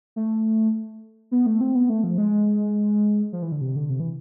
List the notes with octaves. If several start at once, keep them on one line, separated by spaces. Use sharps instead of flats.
A3
B3
A3
C4
B3
A3
F3
G#3
F3
E3
D3
C3
D3
C3
E3